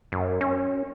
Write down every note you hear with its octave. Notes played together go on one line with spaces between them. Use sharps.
F#2
C#4